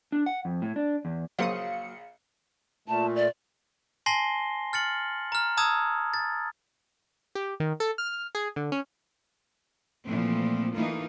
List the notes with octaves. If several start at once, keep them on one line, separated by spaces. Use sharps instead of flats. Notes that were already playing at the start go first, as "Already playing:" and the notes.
D4
F#5
F2
A2
D4
E2
A#1 C#3 F#3 A#3 C5 F5 D#6 C#7
A#2 A3 A5
D5
G#5 A5 C6 A#6 C7 G7
F6 A6 C#7 F#7
A#5 F6
A5 A#5 D#6 E6 G#6
A6
G4
D#3
A4
F6
G#4
D3
C#4
A#2 E3 F3 A3 C4
E3 A3 A#3 D#4 F4